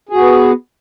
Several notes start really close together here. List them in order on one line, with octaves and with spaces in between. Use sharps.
G#4 F#4 B3